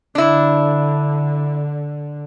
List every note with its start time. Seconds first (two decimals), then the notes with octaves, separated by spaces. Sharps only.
0.15 D3 D4 E4